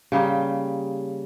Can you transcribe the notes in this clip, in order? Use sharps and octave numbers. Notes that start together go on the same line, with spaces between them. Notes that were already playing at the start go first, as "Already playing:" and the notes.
C#3 G3 A#3 G4